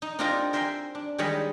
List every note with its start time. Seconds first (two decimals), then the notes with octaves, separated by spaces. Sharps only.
0.02 D#4
0.19 C4 D4 D#4 F4 G4 A#4
0.53 A#4 C5 E5 G5 G#5 C6
0.95 D4
1.18 D#3 G3 G#3 C#5 D#5 B5